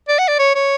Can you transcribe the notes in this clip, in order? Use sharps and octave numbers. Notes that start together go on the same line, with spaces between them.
D5
F#5
D5
C#5
C#5